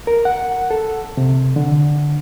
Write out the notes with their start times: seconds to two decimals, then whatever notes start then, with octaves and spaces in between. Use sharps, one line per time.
0.07 A#4
0.25 F#5
0.71 A4
1.17 C3
1.56 D3